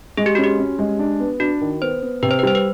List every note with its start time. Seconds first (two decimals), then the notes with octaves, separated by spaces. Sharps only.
0.17 G#3 G#4
0.26 G4
0.35 C#4 F#4
0.44 G4
0.59 C#4
0.79 G#3
0.99 D4
1.20 B3
1.40 D4 F#4
1.61 D#3
1.82 B3 C5
2.02 B3
2.22 C3 B4
2.31 C5
2.39 B4
2.43 G3 C5
2.55 B4